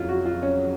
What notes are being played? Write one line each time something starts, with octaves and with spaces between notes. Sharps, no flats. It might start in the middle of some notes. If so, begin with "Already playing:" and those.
Already playing: F2 C#3 F#3 E4 F4
F#4
F4
C#4